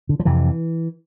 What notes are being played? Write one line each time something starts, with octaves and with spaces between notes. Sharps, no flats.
D3
F3
F2 C3 E3